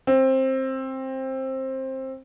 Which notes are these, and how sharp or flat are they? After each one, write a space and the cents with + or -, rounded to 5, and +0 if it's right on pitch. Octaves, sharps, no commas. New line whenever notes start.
C4 +15